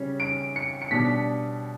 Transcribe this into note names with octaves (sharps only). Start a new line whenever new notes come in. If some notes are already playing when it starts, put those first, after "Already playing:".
Already playing: C#3 G3 C#4
D7
C#7
C#7
B2 G3 D4 B6